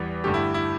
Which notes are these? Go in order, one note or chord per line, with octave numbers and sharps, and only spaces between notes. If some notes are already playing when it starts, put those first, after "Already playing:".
Already playing: E2 E3 G3 B3
G2 D3 A3 G4
E4
E4